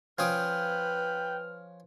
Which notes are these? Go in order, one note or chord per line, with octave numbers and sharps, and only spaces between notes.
F3 C#4 B4 G5 D#6 F6